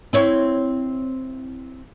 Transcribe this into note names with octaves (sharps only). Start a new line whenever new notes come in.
C4 E4 C#5